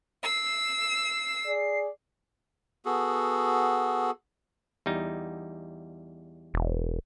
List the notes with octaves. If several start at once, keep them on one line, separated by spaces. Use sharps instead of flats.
E6 C7
G#4 D5
B3 F#4 G#4 A4
E2 G3 D#4
E1